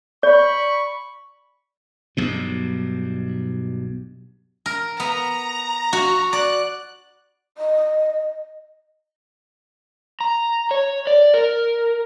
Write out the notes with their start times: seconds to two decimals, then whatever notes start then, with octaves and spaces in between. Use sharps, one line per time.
0.23 D5 B5 C#6
2.17 B1 G2 B2
4.66 A#4
5.00 B3 A#5
5.93 F#4
6.33 D5 F#6
7.58 D#5
10.21 A#5
10.71 C#5
11.07 D5
11.34 A#4